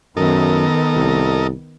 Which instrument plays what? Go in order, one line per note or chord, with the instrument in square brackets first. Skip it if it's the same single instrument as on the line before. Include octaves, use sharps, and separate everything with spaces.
[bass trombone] F#2 [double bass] D#3 B3 [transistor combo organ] A4 A#4 D#5
[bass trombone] C2